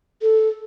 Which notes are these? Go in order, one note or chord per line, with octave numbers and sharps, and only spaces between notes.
A4